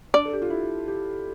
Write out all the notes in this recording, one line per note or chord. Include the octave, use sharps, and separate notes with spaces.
D4 D5
A4
G4
F4
E4
G4